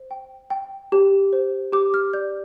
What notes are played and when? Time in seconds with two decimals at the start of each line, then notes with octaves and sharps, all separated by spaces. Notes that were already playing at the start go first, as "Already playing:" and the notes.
Already playing: C5
0.11 G5
0.50 G5
0.92 G4
1.33 C5
1.72 G4 D6
1.94 F6
2.13 D5 G6